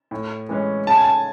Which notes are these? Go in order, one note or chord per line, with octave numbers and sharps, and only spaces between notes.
A2
E3 G#3 C#4
C#3 A5
G#5
A5